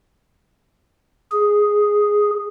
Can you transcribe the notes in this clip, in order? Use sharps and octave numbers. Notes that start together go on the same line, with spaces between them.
G#4